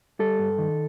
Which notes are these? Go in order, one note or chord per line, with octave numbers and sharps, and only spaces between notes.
G3 A4
G2
D#3